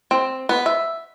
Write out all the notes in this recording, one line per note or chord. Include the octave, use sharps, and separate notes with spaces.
C4
B3
E5